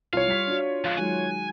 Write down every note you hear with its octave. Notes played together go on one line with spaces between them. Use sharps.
C2 F4 C#5 F5
G3 B6
D4 F#4
F3 G#3 F5 F#6
D#3 F#3 G#3 G#5